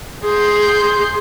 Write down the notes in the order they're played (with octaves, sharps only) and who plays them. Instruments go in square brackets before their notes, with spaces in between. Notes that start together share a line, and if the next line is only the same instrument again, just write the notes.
[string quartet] G#4 C6 G6